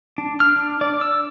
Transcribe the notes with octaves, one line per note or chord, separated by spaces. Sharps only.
D4
F6
D4
D5
E6